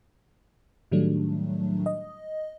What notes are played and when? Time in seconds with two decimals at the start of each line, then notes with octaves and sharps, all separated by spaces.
0.92 A2 D#3 F#3 G3 A3 D4
1.86 D#5